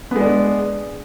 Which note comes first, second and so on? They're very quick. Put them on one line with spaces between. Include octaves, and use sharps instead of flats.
B3 G#3 D4